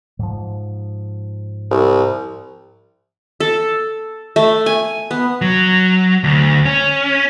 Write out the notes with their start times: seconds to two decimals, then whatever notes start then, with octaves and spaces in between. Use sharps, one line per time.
0.19 G#2 F3
1.71 C2
3.40 A4
4.36 A3
4.66 G#5
5.11 B3
5.41 F#3
6.24 D2
6.65 C#4